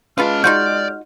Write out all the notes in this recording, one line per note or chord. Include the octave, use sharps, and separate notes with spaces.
G#3 C#4 F4 B4 F5 A5 F6
D#4 F4 F#4 D5 G6